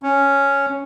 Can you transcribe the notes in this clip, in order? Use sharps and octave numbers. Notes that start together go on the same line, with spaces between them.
C#4